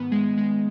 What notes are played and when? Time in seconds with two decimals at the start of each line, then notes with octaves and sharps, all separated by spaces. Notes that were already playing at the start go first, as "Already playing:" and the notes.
Already playing: G#2 D#3 B3
0.12 G#3
0.37 G#3